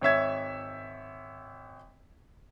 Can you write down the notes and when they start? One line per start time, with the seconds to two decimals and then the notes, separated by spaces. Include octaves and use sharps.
0.01 G#1 C#5 E5 G#6